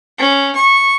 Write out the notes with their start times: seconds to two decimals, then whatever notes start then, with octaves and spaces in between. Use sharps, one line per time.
0.19 C#4
0.55 C#6